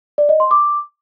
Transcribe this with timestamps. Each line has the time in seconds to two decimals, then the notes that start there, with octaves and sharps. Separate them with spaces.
0.18 D5
0.29 D#5
0.40 C6
0.51 D6